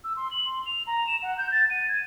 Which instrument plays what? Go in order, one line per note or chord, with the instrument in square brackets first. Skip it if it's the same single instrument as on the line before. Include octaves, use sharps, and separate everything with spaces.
[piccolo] E6
C6
F#7
C6
F7
A#5
E7
F#5
G6
A6
D#7
G#6